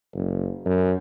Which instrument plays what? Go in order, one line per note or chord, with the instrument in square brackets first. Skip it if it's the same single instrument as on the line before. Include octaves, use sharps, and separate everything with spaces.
[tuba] F#1
F#2